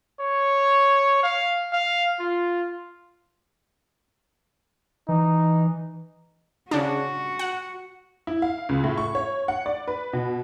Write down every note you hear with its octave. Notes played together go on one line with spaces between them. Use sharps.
C#5
F5
F5
F4
E3 D#4
C#3 D4 F#4
F#5
E4
F5
C#2
A2
C#6
C#5
F#5
D5
B4
B2